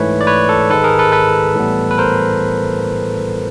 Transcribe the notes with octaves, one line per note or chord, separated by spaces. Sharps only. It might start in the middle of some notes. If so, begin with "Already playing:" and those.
Already playing: G#2 E3 A3 B4 C#5
D5
B4 C#5
A4
G#2 D#3 G#3 A4 B4
G#4 A#4
A4 B4
A4 B4
A2 E3 G3 B3
B4
A#4 C5